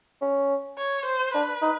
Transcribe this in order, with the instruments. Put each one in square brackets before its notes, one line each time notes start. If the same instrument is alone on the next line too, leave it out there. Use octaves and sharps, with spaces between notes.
[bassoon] C#4
[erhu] C#5
C5
[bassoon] D4 [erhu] B4
[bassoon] D#4